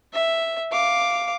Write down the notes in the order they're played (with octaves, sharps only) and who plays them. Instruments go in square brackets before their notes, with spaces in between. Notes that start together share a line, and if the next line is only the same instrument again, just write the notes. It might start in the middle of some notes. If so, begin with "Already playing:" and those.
[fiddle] E5
F5 D6